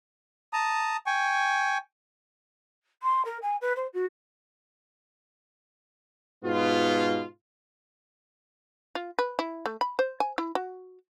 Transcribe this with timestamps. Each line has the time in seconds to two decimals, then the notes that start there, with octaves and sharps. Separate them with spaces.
0.53 A5 A#5 D#6
1.06 G5 G#5 C#6
3.03 C6
3.25 A#4
3.42 G#5
3.61 B4
3.76 C5
3.94 F#4
6.44 G#2 B2 B3 F4
8.95 F4
9.19 B4
9.39 E4
9.66 A3
9.81 B5
9.99 C5
10.20 G#5
10.38 E4
10.55 F#4